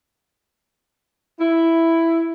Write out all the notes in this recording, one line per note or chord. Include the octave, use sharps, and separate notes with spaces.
E4